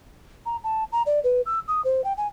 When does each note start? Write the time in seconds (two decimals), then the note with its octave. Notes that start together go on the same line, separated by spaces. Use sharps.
0.46 A#5
0.64 A5
0.92 A#5
1.06 D5
1.24 B4
1.46 E6
1.68 D#6
1.85 C5
2.04 G5
2.18 G#5